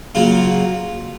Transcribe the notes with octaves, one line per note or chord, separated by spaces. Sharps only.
C#3 F#3 A#3 F4